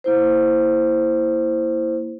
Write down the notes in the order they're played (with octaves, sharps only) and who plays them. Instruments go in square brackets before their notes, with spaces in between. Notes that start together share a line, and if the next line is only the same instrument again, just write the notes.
[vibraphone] A#3 E4 C5